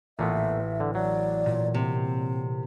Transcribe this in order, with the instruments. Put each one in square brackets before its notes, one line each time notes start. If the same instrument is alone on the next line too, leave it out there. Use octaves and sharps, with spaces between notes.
[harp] A1 [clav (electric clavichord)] A#2 A3 B3 [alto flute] E5
[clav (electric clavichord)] D3
[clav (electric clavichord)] F#3 [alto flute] D5
[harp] A#2
[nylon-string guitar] C3 [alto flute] C4
[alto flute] C4